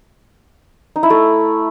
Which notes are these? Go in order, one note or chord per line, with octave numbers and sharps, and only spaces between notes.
D#4
E4
A3